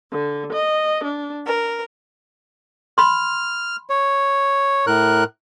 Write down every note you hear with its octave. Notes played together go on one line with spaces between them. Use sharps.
D3
D#5
D4
A#4
B5 C6 F6
C#5
A2 A#4 F#6